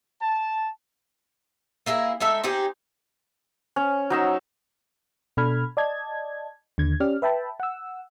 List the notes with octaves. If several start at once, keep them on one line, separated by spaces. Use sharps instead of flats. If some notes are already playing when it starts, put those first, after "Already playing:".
A5
A#3 E4 G#4 A#4
G#3 D#4 A4 E5
C4 D#4 G4 G#4
C#4
F#3 D#4 E6
B2 D4 A4 B5 F6 G#6
D5 D#5 A5 G#6
D#2 D3 G#6
C#4 G4 D5 F6
B4 E5 G5 A5 B5
F#5 E6